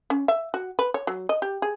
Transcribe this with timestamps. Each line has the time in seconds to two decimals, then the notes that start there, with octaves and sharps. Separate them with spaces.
0.10 C#4
0.28 E5
0.54 F#4
0.79 B4
0.94 C#5
1.07 F#3
1.29 D#5
1.42 G4
1.62 G#4